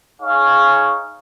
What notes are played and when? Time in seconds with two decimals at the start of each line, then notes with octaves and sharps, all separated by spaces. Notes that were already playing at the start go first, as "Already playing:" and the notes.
0.21 D#4 G#4 C#5 F5 C#6